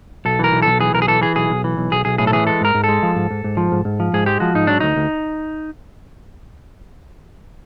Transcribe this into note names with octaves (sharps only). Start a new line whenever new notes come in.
B1 A4
E3 A#4
B1
B1 A4
E3 G#4
B1 A#4
G#4
E3 A4
E3 G#4
B1 G#4
B1
E3
B1
B1 G#4
B1 G#4
A2 G#4
A4
E3 G#4
G#3 A4
G#2 A#4
G#2
G#3 A4
F3
G#2
G#2
G#2
F3
G#2
G#2
F3
G#2 G#4
G#3 G4
F3 F#4
G#2 D#4
F#3 D4
D2 D#4
D2